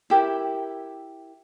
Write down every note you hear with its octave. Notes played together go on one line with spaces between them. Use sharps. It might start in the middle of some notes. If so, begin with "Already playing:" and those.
E4 G4 A#4 E5